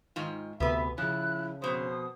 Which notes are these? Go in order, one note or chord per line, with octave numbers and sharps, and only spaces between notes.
G#2 D#3 F4
D2 C3 B3 B4 E5
C#3 F3 C#4 E4 F#6
F2 B2 C5 D#6